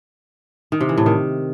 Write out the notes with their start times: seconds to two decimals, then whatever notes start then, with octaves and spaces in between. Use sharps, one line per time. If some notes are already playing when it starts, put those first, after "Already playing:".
0.72 D#3
0.81 C3
0.89 E3
0.97 A2
1.06 D#3